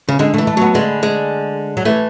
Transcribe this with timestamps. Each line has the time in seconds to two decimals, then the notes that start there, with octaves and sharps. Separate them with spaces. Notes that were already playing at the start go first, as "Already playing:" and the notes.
0.09 C#3
0.19 D3 G#3
0.34 A3
0.38 E3
0.47 A3
0.57 F#3 B3
0.75 D3 G#3
1.03 G#3
1.77 F#3
1.85 E3 A3